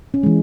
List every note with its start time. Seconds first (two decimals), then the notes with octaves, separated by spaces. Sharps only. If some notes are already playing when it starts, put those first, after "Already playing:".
0.14 C#4
0.23 E3 G#3